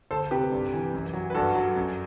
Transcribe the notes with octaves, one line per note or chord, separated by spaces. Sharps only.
D2 A4 C5
C3 G4 B4
G2
E3
F#2
F#3
B4
G2 F#4 A4
F#3
F#2